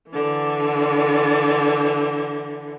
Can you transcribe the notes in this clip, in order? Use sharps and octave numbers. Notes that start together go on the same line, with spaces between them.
D3 E3